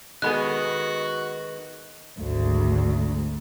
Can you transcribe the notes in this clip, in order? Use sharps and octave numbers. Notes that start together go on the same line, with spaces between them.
D#3 G#3 B3 F#4 A4 B5 F#6
G#1 D2